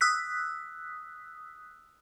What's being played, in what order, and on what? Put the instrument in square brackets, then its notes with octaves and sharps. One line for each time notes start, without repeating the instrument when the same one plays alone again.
[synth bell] D#6 E6 F#6 B6